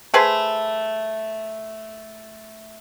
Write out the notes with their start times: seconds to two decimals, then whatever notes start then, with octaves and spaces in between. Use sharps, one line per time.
0.14 A3 G#4 B4 C5